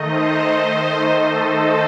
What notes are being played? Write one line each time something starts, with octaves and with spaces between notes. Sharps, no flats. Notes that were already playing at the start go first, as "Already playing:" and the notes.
Already playing: D#3 A3 D#4 D#5
C5
A4